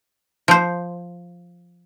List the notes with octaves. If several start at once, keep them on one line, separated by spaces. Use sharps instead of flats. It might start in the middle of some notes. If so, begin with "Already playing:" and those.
F3 C5